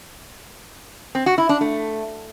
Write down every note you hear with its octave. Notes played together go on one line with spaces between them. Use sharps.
C4
F#4
E4
D4
A3